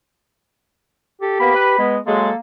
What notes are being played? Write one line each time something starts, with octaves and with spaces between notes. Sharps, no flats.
G4 A4
A#3 B3 B5
B4
G#3 B3
F#3 G#3 A#3 A4